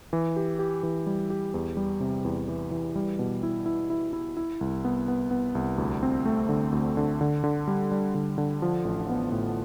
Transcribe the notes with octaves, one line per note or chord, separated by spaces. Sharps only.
E3
G4
G4
E3
G3
G4
E2
G3
C3
E2
E3
E3
G3
B2
E4
E4
E4
E4
E4
C2
B3
B3
B3
C2
D2
C4
A3
D3
D2
D3
D3
D3
G3
G3
D3
D3
F3
A1
B3
A2